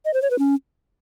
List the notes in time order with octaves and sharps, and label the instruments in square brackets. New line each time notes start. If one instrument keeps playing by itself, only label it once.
[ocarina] D#5
C5
C#5
B4
C#4